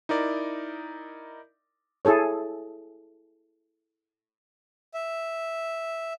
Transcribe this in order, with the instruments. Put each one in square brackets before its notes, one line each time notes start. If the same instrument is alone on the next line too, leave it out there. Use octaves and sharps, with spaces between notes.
[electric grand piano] D#4 E4 A#4 D5
[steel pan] E4 G#4 A4 C#5
[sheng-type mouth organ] E5